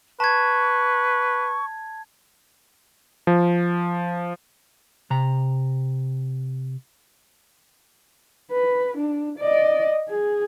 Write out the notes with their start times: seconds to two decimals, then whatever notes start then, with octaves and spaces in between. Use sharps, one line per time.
0.20 B4 A5 C#6 G#6
3.27 F3
5.10 C3 A#5
8.52 B4
8.98 D4
9.39 D5 D#5
10.09 G#4